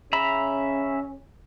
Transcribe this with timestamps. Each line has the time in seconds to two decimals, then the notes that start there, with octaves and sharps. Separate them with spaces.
0.13 C#3 C#4 E5 A#5 B5